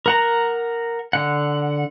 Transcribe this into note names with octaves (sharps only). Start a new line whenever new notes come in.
A#4 F#5 A#5
D3 F#5